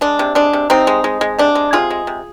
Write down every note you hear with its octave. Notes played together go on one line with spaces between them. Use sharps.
G#3 D4
C3
G#3 D4
C3
C3 C4 D#4
G#3
G#3
G#3
C3 D4
G#3
C3 F4 G#4
G#3
C3